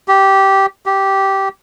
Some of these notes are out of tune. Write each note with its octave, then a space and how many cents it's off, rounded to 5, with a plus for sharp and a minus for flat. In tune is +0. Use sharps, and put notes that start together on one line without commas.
G4 -10
G4 -10